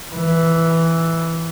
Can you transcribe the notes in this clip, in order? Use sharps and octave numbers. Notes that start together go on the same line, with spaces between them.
E3